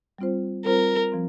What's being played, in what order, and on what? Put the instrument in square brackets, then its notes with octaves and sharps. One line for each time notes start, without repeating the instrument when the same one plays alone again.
[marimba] G3 C4 F4 C5
[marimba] G3 C4 F4 C5 [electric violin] A#4
[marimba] F3 C4